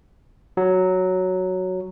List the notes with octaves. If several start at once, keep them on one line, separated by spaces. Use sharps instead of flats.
F#3